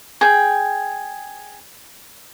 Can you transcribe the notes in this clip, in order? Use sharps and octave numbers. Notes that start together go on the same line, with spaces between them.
G#4 G5